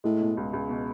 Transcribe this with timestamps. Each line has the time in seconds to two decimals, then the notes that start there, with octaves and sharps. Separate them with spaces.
0.04 A2 G#3
0.21 B2
0.37 C#2
0.53 C#2
0.69 B2